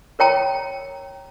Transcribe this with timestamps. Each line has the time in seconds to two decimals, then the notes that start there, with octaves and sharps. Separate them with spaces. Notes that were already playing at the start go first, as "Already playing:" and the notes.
0.19 A#4 C#5 G5 A#5